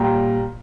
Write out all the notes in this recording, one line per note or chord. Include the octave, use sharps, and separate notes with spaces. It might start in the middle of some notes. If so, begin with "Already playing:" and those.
Already playing: A#2 G3 G5 A#5